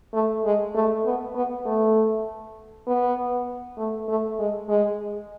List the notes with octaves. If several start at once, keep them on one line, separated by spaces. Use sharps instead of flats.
A3
G#3
A3
B3
B3
A3
B3
A3
A3
G#3
G#3